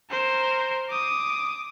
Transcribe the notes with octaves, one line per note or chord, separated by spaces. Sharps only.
A#4 C5
D6 D#6